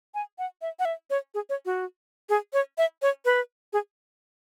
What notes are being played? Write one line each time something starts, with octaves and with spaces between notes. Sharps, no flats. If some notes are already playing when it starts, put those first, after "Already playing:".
G#5
F#5
E5
F#5
E5
C#5
G#4
C#5
F#4
G#4
C#5
E5
C#5
B4
G#4